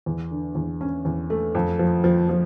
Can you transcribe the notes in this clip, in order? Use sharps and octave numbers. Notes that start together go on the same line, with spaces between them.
E2
D3
E2
C#4
E2
A3
F2
F3
F3
F3